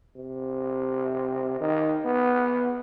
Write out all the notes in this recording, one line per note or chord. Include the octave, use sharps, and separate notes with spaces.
C3
D#3
B3